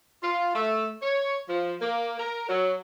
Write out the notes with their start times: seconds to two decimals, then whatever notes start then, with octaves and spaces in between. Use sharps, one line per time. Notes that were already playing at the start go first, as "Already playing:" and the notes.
0.23 F4
0.55 A3
1.02 C#5
1.49 F3
1.82 A#3
2.20 A#4
2.49 F#3